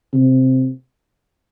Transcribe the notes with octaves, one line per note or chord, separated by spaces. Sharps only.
C3